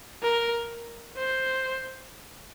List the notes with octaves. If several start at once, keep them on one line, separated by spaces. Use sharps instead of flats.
A#4
C5